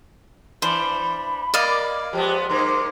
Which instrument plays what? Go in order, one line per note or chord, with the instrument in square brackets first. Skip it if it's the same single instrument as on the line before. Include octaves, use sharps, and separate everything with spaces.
[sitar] E3 D4 [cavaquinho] C5 [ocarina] B5
[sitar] A#3 [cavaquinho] D5 D#5 F5
[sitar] F3 G#3 B3 [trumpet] G4
[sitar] G2 A#3 [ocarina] C5 [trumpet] C6